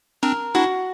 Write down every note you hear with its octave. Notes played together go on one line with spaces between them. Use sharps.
C4 D4 A#4
D4 E4 F#4